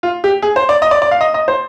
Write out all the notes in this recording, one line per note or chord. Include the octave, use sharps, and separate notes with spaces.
F4
G4
G#4
C5
D5
D#5
D5
D5
F5
D#5
D#5
C5